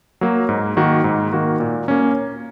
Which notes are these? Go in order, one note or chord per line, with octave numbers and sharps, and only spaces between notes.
F#3 A#3
G#2
D#3 A#3 F#4
G#2
D#3 A#3 F#4
A#2
A#3 C#4